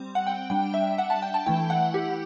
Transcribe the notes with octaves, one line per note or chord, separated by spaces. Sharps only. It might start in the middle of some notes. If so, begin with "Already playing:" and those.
Already playing: G3 C4
F#5
G5
G3 D4 G5
E5
F#5
A5
G5
A5
E3 A3 E4 G5
F#5
G4